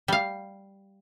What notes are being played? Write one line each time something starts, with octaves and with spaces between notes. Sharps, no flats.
G3 F5